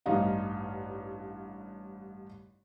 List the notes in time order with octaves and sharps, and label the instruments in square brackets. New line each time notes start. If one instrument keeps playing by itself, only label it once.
[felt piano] A1 G2 D#4 F5